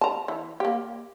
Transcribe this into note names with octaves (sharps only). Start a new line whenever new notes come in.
A5 A#5
E3
A#3 G4